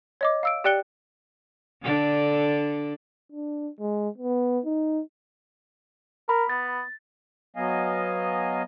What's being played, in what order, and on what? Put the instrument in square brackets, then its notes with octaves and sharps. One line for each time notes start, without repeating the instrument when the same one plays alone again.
[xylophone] C#5 D#5 D6
F5 E6 D7
G4 D5 G5 F#6 C#7 G7
[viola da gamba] D3 D4 A4
[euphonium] D4
G#3
B3
D#4
[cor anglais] A#4 [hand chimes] B5
[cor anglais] B3 [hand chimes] A6
[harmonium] F#3 B3 D#5 F5 G#5